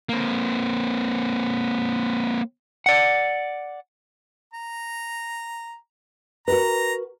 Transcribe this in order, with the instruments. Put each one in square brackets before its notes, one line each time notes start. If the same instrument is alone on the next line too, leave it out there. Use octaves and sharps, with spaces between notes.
[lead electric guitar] A#3 C4
[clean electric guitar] D5 F#5
[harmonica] A#5
[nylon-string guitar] F#4 A#4 B4 [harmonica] A#5